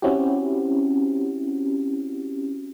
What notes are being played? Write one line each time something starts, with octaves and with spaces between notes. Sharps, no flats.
C4 C#4 E4 F#4 G4